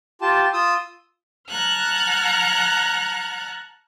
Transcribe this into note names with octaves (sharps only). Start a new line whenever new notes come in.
F4 G4 A5
F4 D#6 E6
F#5 A5 A#5 F6 F#6 G#6